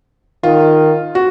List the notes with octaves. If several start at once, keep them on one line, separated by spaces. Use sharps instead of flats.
D#3 F4
F#4